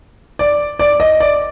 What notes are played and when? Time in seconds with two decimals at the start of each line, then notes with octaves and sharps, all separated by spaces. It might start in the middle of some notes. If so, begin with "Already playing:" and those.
0.39 D5
0.79 D5
1.00 D#5
1.20 D5